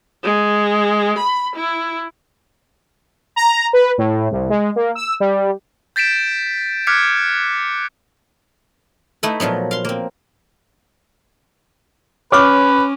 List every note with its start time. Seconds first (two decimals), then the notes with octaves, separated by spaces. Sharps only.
0.23 G#3
1.18 B5
1.56 E4
3.36 A#5
3.73 B4
3.98 A2
4.31 C2
4.50 G#3
4.76 A#3
4.95 E6
5.20 G3
5.96 G6 A6 B6 D7 E7
6.87 D6 F6 F#6 G#6 B6 C#7
9.23 A3 D#4 E4 B4
9.40 A#2 F3 F#3 B3
9.71 F5 C6
9.85 A#3 C4
12.32 C#4 B4 C#5 C#6 D6 F6